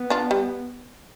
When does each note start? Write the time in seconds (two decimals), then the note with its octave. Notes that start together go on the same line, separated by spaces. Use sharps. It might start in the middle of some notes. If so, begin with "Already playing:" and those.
Already playing: B3
0.10 D4 F4
0.31 G3